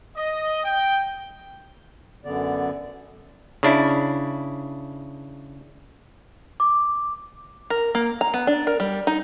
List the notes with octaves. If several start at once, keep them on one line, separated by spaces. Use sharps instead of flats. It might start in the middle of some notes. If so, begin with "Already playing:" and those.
D#5
G5
F#2 D3 B3 D5
C#3 D4 E4
D6
A#4
A#3
A#5
B3
D4
A#4
G3
D#4